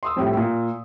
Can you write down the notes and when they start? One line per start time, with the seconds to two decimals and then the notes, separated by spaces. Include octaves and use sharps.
0.03 C6 D#6 E6
0.16 F2 A2 G3
0.37 A#2